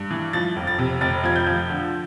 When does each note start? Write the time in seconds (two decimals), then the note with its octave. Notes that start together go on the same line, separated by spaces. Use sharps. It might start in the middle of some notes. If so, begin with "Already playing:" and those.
Already playing: G2
0.11 E3
0.33 F3 A6
0.56 F1
0.67 A6
0.79 C3
1.01 F1 A6
1.24 F3 G#6
1.36 G6
1.47 F3
1.70 D3